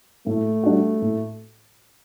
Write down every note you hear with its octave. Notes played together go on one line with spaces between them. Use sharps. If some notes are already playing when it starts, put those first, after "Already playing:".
A2 A3
G3 D4 F#4
A2